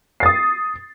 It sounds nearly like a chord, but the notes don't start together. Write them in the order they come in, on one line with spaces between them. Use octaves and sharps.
C7 A6 D#6